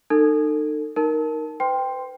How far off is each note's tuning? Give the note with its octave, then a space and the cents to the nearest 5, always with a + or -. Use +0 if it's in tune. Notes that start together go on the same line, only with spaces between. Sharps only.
D#4 -30 A4 +30
D#4 +0 A#4 +0 A5 -10
B4 +45 G5 +5 C6 -5